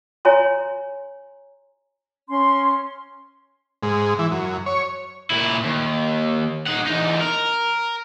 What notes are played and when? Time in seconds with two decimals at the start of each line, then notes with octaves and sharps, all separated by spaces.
0.25 C#5 G#5 A#5 C6
2.29 C#4 C6
3.83 G#2
4.19 E3
4.32 F#2
4.66 C#5
5.30 A#2 E4
5.65 D#2
6.66 D#4 F#5
6.86 E2 D#4
7.21 A#4